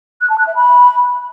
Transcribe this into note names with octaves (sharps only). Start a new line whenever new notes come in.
F#6
A5
F#6
E5
B5